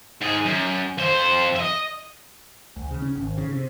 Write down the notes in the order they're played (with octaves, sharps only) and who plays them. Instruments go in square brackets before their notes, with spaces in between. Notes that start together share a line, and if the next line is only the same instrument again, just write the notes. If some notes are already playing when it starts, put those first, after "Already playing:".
[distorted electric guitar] G#2 G#4
F#2
F2 C5
D#5 E5
[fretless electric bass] D2
C#3
C#4
G#1
C#3
C3